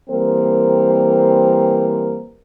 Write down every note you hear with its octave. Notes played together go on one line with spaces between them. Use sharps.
E3 G3 A#3 C4 A#4 C5